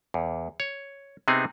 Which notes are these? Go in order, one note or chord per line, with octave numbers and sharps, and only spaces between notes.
E2
C#5
C3 B3 C4 D#4 G#4